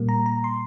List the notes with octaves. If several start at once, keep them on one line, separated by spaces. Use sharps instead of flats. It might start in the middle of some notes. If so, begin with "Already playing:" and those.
Already playing: A#2 G3 A#3
A#5
A#5
C6